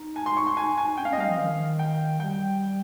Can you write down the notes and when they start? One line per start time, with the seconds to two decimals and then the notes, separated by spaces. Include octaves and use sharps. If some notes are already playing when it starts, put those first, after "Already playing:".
Already playing: D#4
0.16 G#5
0.26 C6
0.37 C#6
0.47 C6
0.57 G#5
0.78 G#5
0.97 C#4 G5
1.05 F5
1.08 C#4 D#5
1.17 G3 F5
1.28 F3
1.38 D#3
1.79 G5
2.20 G3 G5